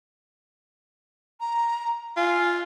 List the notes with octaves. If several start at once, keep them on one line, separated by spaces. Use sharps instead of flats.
A#5
F4 G#5